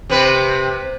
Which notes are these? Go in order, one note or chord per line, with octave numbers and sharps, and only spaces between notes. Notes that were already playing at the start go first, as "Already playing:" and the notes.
C3 C4 B4